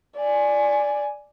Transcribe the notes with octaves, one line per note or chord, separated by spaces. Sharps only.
D5 G#5